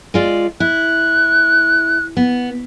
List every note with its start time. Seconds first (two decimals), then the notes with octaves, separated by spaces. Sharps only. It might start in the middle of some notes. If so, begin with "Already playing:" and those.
0.14 G#3 F4 D5
0.60 E4 F#6
2.17 B3